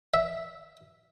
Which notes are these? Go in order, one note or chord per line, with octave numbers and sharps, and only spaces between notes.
E5